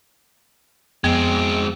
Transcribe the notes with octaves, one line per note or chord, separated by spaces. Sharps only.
F2 G#3 B3 C4